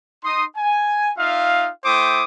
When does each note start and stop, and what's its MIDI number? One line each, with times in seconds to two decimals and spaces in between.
0.24 0.44 63
0.24 0.44 84
0.24 0.44 87
0.56 1.11 80
1.18 1.70 63
1.18 1.70 65
1.18 1.70 76
1.18 1.70 77
1.85 2.24 57
1.85 2.24 64
1.85 2.24 72
1.85 2.24 79
1.85 2.24 86
1.85 2.24 87